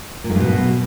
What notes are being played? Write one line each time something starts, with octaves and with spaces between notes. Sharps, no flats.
A#2
G#2
G2
B2